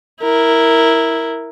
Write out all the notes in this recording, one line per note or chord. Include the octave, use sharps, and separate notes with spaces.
E4 A#4